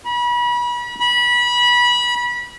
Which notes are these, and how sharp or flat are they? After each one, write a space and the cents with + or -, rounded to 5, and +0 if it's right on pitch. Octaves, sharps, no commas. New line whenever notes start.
B5 -35
B5 -25